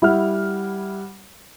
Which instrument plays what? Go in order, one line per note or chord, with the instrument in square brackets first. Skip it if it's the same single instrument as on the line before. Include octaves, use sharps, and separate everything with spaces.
[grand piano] G3 F#5 F6 [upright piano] E4